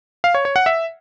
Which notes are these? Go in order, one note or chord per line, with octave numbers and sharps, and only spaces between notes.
F5
C#5
C#5
F#5
E5